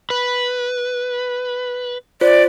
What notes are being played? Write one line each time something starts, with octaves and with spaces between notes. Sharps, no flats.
B4
F4 C5 D5